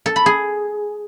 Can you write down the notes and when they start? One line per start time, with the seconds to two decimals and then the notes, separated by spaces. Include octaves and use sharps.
0.06 A4
0.16 B5
0.26 G#4